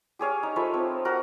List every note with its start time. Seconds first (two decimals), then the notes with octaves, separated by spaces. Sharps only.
0.19 G4 G#4 C#5 F5
0.43 D#4
0.56 F3 A3 B5 C#6
0.74 C4
1.05 F#4 A#4